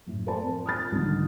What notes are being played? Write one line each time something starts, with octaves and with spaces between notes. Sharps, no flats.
F#1 A2
A4 A#4 C5 D5 A5
F3 C4
D#6 F6 A6
C2 G#2 D3 D#3 F3